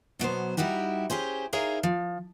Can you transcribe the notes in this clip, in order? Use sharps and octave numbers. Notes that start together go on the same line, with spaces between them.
B2 F#3 B3 C5
G3 D#4 E4 F#4 G4
C#4 G4 G#4 C5
D#4 E4 G#4 A#4 C#5 F5
F3